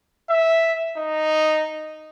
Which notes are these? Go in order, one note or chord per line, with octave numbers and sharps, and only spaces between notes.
E5
D#4